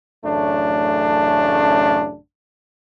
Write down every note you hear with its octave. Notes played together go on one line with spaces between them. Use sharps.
A1 F#2 C#3 A3 D4